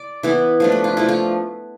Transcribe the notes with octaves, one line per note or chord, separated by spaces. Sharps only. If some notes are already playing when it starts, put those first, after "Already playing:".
Already playing: D5
E3 B3 E4
F3 A3 D4
B4
F4
F3 A3 D4 E4
F4